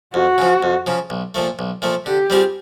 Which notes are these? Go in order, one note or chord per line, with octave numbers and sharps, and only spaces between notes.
F2 F#4
C#3 F3
F2
C#3 F3
B1
A#2 F3 A3
B1
A#2 F3 A3
D3 G4
G3 C4 F4 G#4